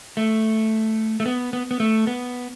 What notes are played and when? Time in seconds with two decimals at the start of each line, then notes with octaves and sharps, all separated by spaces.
0.17 A3
1.20 A3
1.26 B3
1.53 B3
1.71 B3
1.80 A3
2.07 B3